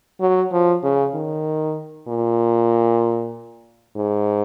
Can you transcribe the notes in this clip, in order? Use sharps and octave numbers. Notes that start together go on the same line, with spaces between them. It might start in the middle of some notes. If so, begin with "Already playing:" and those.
F#3
F3
C#3
D#3
A#2
G#2